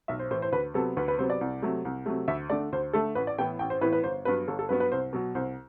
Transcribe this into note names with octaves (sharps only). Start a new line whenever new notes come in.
B1 E5
C5
A2 E3 C5
C5
D2 B4
C3 F#3 B3 A4
D2 B4
B4
C3 F#3 B3 C5
D5
C2
C3 F#3 A3
C2
C3 F#3 A3
D2 E5
D3 A3 D5
D2 C5
D3 A3 A4
A1 B4
D5
A2 E3 B3 G5
A1 G5
C5
A2 E3 B3 B4
B4
G1 C5
G2 F#3 B3 B4
G1 A4
A4
G2 F#3 B3 B4
B4
C2 C5
B2 F#3
C2 C5